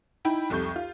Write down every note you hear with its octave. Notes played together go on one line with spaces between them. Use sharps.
D#4 E4 G5 B5
C2 F2 A4 C#6 G6
F4